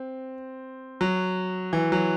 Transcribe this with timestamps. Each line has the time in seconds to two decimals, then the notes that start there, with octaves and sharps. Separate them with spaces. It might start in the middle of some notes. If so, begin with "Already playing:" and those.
Already playing: C4
1.01 F#3
1.73 E3
1.92 F#3